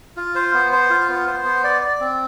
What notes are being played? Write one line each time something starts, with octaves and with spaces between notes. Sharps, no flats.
F4
C5
B3
C5
F4
B3
C5
B3
D5
D5
C4